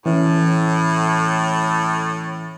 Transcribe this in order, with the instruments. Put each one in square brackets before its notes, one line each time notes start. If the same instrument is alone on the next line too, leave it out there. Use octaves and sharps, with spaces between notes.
[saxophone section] A2 [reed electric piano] E3 C#4 E4